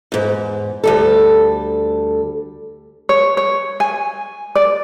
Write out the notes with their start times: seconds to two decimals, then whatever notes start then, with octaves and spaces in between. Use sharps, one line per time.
0.12 E2 G#2
0.84 D2 G3 A4
3.09 C#5
3.37 C#5
3.80 G#5
4.55 D5